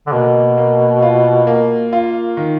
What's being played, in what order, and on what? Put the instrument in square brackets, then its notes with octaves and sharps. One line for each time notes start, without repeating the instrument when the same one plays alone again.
[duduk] D3
[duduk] B2 [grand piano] A#3
[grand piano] A#3
F4
A#3
F4
D#3